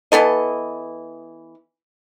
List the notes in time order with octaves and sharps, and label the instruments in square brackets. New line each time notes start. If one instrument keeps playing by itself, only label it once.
[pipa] E3 B3 A4 D#5